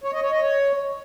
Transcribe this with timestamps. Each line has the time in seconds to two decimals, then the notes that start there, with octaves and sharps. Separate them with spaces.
0.04 C#5
0.13 D#5
0.22 C#5
0.31 D#5
0.41 C#5